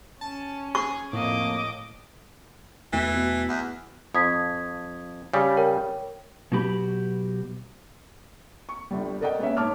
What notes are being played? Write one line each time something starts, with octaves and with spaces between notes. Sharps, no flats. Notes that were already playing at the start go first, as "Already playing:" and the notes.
C#4 A5
G#4 C#6
F2 A2 A#3 D#5 D6
E2 B2 E3 A3
B2
E2
F2 D#6 G#6 B6
C#3 G3
A#4 C#5 G5
B2 F#3 F#4 G4 B5
C#6
G1 G3
A4 A#4 D5 D#5 F#5 G5
G#3 A#3 B3 C#4 C#5 E5
G#2 C#5 A5 D6 F6